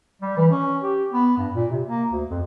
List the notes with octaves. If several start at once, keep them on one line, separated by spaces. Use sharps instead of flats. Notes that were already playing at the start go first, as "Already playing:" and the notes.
G3
E3
C#4
G4
B3
G2
A#2
C3
A#3
D2
F2